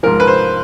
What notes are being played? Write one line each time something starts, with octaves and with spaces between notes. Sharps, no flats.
G#2 F3 A#4
B4
C5